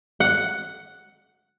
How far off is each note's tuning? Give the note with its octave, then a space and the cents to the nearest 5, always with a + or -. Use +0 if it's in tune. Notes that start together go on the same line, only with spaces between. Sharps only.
F#5 +0